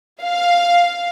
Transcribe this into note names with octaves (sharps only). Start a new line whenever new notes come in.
F5